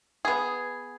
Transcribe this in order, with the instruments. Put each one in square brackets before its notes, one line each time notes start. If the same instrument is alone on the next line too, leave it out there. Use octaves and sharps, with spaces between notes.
[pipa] B3 G#4